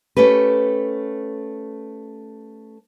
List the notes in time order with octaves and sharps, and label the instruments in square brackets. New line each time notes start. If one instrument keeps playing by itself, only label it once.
[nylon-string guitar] A3 C#4 G4 B4